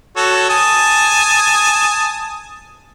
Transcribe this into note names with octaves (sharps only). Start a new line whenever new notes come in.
F#4 A4 C#5
G#5 A5 D#6